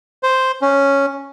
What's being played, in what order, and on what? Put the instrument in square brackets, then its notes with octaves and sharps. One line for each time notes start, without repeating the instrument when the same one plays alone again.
[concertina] C5
C#4